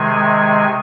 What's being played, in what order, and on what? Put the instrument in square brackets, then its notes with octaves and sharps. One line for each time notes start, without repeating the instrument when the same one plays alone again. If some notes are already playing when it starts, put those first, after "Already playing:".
Already playing: [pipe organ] C3 D#3 G#3 G#5